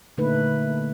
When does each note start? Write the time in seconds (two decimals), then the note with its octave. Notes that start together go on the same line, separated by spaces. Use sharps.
0.17 A#2 D3 A3 A#3 D#4 B4